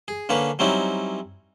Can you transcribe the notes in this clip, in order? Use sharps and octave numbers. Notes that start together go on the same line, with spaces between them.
G#4
D3 A#3 C#4 B4
F#3 G3 C4 C#4 D#4 E4